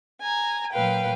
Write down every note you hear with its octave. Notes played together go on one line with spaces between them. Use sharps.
G#5 A#5
A#2 F#3 B4 F5 G5